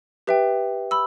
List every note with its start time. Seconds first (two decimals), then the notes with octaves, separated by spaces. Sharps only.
0.27 G4 B4 E5 G5
0.91 B5 E6